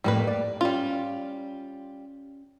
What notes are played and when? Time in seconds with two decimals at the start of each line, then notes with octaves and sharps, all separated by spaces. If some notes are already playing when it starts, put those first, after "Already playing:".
0.04 F2 A2 G3 A#3 B4
0.27 D5
0.61 G3 C#4 F4